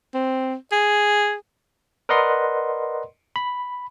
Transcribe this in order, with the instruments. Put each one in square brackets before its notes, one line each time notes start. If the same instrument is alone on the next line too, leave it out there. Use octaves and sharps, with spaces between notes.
[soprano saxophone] C4
G#4
[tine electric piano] A#4 B4 D5 D#5 F#5 C6
B5